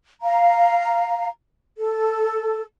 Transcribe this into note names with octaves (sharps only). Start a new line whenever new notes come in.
F5 A#5
A4